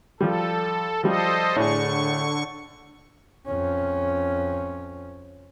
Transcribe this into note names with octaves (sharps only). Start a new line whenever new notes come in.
F3 G3 A4
F3 G3 A4 C5 D#5
A2 D3 D4 G#4 C#6
F2 C#4